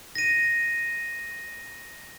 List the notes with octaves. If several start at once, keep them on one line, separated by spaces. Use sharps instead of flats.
A#6 D#7